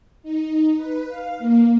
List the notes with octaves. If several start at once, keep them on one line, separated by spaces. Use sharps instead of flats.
D#4
B4
F5
A#3